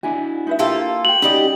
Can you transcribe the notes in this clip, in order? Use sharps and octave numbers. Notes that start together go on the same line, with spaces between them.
D4 E4 F#4 G#5
D#4 B4 E5
A#3 F4 G4 A4
F#4 G5 F#7
G3 C#4 D#4 G4 D5 D#5